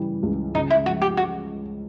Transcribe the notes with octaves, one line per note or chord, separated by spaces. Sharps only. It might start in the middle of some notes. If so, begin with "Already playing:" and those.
Already playing: C#3 E3 G3
C#2
C#3 D#4
E4
F3 F#4
G4
G#3 F#4